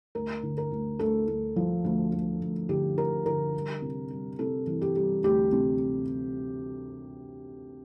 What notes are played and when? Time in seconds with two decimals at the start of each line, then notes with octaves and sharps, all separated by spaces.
0.15 D2 A#4
0.43 D3
0.58 A#4
0.71 D2
0.99 D2 A4
1.28 D2
1.56 F3
1.84 D2
2.12 D2
2.41 D2
2.69 D3 G4
2.97 D3 A#4
3.26 D3 A#4
3.54 G3
3.82 C3
4.10 G3
4.39 C3 A4
4.67 E3
4.81 G4
4.96 G3
5.23 D2 G4
5.52 C3